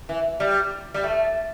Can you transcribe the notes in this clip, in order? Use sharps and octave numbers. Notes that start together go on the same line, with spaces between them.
E3
G3
G3
A3